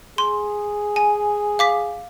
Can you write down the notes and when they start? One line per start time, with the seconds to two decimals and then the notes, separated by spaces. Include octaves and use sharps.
0.18 G#4 C6
0.96 G#5
1.59 F5 D6 B6